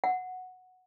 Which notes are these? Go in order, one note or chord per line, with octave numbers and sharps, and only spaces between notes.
F#5